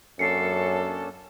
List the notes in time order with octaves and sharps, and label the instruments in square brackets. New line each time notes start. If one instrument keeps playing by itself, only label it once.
[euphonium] F#2 [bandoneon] A#3 C#4 D4 [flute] A4 [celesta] C7 C#7